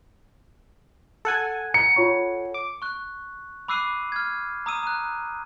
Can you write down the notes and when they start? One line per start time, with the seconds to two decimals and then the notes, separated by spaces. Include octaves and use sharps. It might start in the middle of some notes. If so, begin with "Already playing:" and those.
1.25 A4 F#5 G#5
1.74 A#5 C#7
1.96 F4 C#5 C#6
2.54 D6
2.82 C#6 F#6
3.68 B5 D6 E6 F#6 C7 D#7
4.12 F6 G#6
4.66 A#5 D#6 E6 D#7
4.83 A#5 F#6